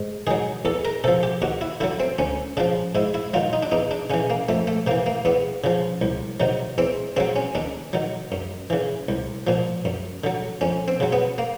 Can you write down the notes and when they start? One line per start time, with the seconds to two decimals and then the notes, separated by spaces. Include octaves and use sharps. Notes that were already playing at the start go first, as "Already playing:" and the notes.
Already playing: G#2
0.27 D#3 F#3 G#4
0.65 E2 A4
0.85 A#4
1.04 C3 F3 A4
1.23 G4
1.42 D#2 F#4
1.61 E4
1.80 D3 F#3 E4
2.00 C4
2.18 D2 C#4
2.57 C#3 F3 D4
2.95 G#2 E4
3.14 E4
3.34 D#3 F#3 F4
3.53 D#4
3.63 D4
3.72 E2 D#4
3.91 D4
4.10 C#3 E3 C#4
4.30 A#3
4.49 F2 A3
4.67 A3
4.87 C3 E3 A#3
5.06 A#3
5.25 E2 B3
5.64 C#3 F3
6.02 C2
6.40 C3 D#3 F#3
6.78 E2 C4
7.17 C#3 F#3 C4
7.36 C#4
7.55 D#2 D4
7.93 D#3 F#3
8.32 F#2
8.70 C#3 E3
9.09 C2
9.47 A#2 F3
9.85 F#2
10.24 D3 F#3
10.61 F2 C#4
10.88 C4
11.00 C#3 F#3
11.13 B3
11.38 A#3